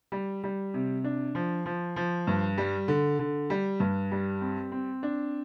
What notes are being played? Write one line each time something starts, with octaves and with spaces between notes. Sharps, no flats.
G3
G3
C3
D4
F3
F3
F3
G2
G3
D3
D3
G3
G2
G3
C4
C4
D4